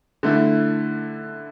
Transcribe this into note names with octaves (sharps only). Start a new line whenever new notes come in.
D3 A3 E4